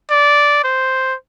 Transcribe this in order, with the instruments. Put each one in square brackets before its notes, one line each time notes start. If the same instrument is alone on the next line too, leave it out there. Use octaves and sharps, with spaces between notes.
[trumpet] D5
C5